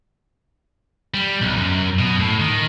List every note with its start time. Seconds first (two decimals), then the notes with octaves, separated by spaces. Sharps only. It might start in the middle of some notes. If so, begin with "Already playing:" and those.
1.14 G3
1.41 B1
1.58 F#2
1.99 B2
2.19 A2
2.40 D#3